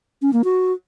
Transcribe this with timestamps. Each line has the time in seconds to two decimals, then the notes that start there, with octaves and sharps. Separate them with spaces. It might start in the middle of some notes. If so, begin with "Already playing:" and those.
0.22 C#4
0.33 A#3
0.44 F#4